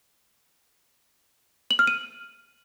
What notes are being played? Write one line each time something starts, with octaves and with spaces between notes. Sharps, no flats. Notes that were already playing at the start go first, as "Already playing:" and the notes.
F#7
F6
D#7